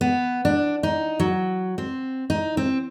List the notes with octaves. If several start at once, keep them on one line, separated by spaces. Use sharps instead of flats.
B3
D4
D#4
F#3
C4
D#4
C4